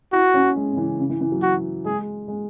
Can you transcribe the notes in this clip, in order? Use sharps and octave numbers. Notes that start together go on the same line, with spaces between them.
E4 F#4
C#4
G#3
C#3
E3
C#3
E3
E3
F#3
F#4
G#3 G#4
G#3